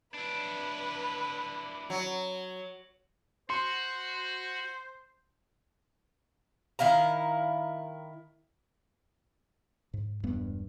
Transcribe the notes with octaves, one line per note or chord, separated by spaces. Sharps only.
D4 E4 B4
F#3
F#4 C5 C6
D#3 E4 F5 A#5
G#2
E1 G2 B3